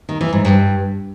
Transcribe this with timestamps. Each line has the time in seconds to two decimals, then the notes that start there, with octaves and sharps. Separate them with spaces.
0.09 D#3
0.21 E3
0.33 G#2
0.45 G2